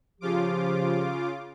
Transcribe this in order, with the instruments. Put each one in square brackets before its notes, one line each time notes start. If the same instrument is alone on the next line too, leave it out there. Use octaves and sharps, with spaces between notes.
[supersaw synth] C#3 F4 D6 [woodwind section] F3 G4